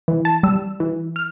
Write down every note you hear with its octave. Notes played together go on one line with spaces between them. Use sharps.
E3
A5
G3 E6
E3
F6